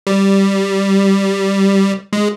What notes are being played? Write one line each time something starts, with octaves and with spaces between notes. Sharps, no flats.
G3
G#3